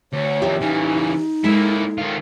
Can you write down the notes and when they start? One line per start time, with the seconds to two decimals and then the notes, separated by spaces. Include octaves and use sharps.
0.13 D2 C#5
0.42 D#2 F3 G4 D5 E5
0.61 C#3 E3 D#4
1.44 G#3 A#3 E4 A4
1.98 D#3 F4